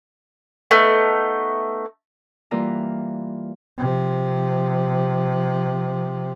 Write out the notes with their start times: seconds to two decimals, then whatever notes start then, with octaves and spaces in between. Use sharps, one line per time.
0.71 A3 B3 D#4
2.51 E3 G3 A#3 F4 A#4 B4
3.78 C3 F3